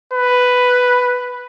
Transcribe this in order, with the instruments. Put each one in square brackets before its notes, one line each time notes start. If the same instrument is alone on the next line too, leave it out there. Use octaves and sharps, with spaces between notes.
[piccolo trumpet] B4